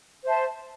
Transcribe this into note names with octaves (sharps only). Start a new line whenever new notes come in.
C5 E5 A5